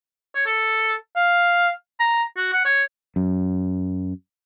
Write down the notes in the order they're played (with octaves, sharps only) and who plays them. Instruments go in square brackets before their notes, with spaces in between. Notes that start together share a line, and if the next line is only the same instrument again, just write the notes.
[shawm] C#5
A4
F5
A#5
F#4
F#5
C#5
[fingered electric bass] F#2